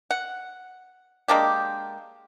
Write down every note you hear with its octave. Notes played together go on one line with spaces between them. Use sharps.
F#5
G#3 A#3 D4 G4